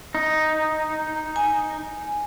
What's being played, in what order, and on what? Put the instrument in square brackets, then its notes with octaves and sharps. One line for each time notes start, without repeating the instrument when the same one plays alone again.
[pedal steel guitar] D#4
[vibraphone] G#5